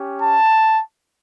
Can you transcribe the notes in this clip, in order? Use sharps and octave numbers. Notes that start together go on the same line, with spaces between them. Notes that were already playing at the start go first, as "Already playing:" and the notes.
Already playing: C#4 G4
A5